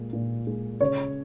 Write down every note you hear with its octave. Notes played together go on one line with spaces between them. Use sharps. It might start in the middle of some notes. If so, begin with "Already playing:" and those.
Already playing: A#2 G#3
A#2
G#3
C#3 C#5